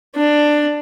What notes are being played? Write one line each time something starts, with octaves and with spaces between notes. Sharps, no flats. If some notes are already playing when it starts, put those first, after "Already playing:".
D4